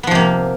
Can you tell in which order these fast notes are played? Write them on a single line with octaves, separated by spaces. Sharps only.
B3 F3 C3 A#3